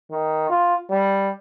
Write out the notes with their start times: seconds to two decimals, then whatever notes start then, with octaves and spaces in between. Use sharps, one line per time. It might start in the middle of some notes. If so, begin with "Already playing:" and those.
0.11 D#3
0.50 F4
0.90 G3